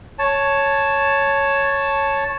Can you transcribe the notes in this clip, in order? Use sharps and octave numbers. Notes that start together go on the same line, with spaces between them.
C#5 A5